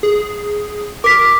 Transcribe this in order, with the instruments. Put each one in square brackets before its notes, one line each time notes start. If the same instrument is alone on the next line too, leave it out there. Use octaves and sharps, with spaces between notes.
[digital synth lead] G#4
[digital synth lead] A#4 [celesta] D6 B6